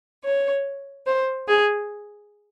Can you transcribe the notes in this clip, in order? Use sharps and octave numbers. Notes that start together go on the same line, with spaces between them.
C#5
C5
G#4